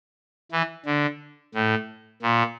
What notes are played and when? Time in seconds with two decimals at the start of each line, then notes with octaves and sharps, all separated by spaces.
0.52 E3
0.86 D3
1.54 A2
2.22 A#2